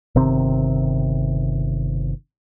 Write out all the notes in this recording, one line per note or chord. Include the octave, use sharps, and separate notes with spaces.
G1 C3 D#3 C4